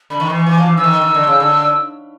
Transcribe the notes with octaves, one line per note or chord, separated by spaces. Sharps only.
D3 B5
D#3
E3 C#6
E3
F3 D6
E3
E3 E6
D#3
D#3
D3
C#3
D3